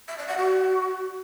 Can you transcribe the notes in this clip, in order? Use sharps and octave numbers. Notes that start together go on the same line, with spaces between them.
E5
D5
F#5
F#4